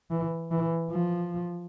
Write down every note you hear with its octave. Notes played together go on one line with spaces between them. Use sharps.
E3
E3
F3